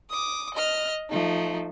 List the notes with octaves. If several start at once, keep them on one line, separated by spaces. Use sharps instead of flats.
D6 D#6
D#5 F6
F3 A3 D#4